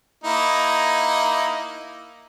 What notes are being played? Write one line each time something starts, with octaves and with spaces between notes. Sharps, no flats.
A#3 D#4 E4